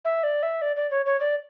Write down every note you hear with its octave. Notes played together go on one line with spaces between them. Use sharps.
E5
D5
E5
D5
D5
C#5
C#5
D5